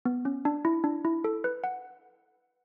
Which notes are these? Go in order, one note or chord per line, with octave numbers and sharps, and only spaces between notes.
B3
C#4
D4
E4
D4
E4
A4
B4
F#5